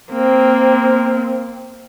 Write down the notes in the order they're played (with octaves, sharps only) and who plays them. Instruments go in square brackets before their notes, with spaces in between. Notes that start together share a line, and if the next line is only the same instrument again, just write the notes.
[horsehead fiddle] A#3 C4